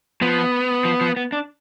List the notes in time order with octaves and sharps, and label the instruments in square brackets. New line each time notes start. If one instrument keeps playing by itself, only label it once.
[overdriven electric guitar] F3 [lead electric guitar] B3
[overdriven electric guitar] F3
F3
B3
D4